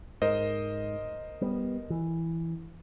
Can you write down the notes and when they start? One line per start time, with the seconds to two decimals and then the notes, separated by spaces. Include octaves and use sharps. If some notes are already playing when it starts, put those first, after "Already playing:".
0.22 G#2 A#4 C5 D#5
1.41 G3 B3
1.90 E3